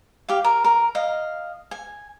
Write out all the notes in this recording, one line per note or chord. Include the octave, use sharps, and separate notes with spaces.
G4 F5
A#4
A#4
D#5 F5
G#5